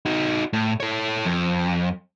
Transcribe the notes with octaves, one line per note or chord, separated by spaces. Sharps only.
D#4 F#4
A2
A4 C#5
F2